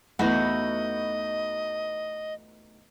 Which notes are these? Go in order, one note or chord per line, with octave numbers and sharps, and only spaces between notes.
E2 E3 A3 D#4 F#4 B4 D#5 F#5